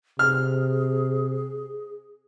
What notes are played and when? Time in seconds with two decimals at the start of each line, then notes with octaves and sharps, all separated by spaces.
0.19 C3 G#4 F6